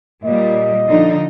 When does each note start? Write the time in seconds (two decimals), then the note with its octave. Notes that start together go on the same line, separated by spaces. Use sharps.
0.25 A#2 G3 D#5
0.87 D3 F3 D#4